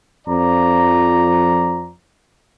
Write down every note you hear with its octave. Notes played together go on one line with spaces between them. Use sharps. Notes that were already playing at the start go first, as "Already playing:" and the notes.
F2 F3 D5 A#5